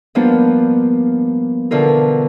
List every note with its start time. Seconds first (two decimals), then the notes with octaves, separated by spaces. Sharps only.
0.15 F3 G3 A#3 B3 D4 F4
1.71 B2 D3 E3 F4 A#4